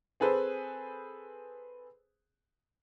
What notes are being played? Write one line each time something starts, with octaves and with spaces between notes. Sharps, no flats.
C4 G#4 A4 B4 C5